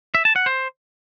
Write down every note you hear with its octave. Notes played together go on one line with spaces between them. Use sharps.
E5
A5
F#5
C5